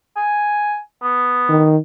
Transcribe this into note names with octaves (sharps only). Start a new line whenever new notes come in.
G#5
B3
D#3